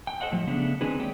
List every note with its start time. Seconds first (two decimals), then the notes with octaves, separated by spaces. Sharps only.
0.07 G5
0.20 A4 C5 D#5 F#5 G5
0.31 A2 F3 G3
0.47 C#3 A3 B3 D4
0.81 D#3 C4 D4 D#4 G#4 B4
0.99 G#3 A#3 G4 C#5 D5 G5